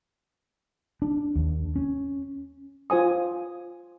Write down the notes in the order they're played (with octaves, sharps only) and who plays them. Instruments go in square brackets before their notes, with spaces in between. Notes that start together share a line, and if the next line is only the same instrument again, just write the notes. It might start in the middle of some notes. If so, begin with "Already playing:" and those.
[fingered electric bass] D4
D#2
C#4
[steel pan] F4 C5 G#5 D#6